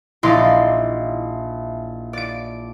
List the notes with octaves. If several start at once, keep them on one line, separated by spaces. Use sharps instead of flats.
A#1 D#4 E4 D5 C6
D5 D7